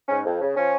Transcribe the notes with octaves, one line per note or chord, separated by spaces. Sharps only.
G#2 C#4
F2
C#3
F3 C#4